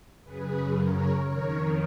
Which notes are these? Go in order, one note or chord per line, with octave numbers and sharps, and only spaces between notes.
F#2 C#3 G#4 B4
A#4 C#5
F2 D#3 A#4 C#5